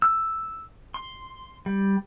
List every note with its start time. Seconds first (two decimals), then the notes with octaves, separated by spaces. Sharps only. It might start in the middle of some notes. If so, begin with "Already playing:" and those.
0.02 E6
0.94 C6
1.66 G3